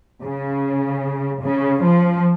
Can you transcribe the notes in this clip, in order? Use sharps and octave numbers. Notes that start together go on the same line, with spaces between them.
C#3
C#3
F3